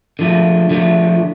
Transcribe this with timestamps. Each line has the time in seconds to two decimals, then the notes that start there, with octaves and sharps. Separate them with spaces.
0.19 D3 F3 A3
0.70 D3 F3 A3